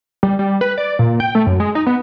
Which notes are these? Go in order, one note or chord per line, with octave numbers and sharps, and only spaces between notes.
G3
G3
B4
D5
A#2
G5
A3
F#2
G#3
D#4
B3